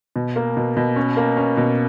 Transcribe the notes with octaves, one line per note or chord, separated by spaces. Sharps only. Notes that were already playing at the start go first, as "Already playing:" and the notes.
B2
A#3
B2
B2
C#4
A#3
C#4
B2